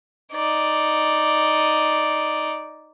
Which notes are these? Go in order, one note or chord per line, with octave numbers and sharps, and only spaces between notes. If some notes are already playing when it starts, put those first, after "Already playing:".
D#4 D5